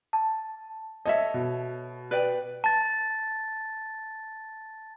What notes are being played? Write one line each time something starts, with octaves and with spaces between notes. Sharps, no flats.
A5
A4 C#5 D#5 E5
B2
B4 D5 G5
A5 A6